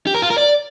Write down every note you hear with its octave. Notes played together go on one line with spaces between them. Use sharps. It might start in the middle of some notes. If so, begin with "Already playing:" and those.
G4
A#4
F4
A#4
D5